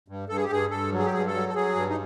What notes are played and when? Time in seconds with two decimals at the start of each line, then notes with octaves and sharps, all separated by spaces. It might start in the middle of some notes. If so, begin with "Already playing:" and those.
0.08 G2
0.29 G2 A4
0.37 G#4
0.44 G4
0.50 G2 G#4
0.71 G2 A4
0.92 F#3
0.99 G#4
1.06 G4
1.13 G2 G#4
1.27 A4
1.34 F#3
1.49 A4
1.55 F#3 G#4
1.75 G2
1.89 D#4